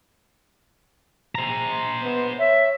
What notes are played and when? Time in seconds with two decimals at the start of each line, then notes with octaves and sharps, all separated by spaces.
1.35 C5 A#5
2.03 B3
2.39 C#5 E5